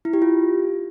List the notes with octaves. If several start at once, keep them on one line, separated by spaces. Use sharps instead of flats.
E4
G4
F4